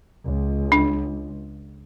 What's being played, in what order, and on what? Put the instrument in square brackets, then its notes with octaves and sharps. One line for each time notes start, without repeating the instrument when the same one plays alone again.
[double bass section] C#2
[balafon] D4